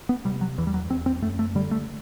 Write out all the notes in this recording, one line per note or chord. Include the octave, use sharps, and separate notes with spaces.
B3
C3 G3
F#3
E2 E3
G3
F#3
E2 C4
C4
F#2 A3
A3
D3 G3
A3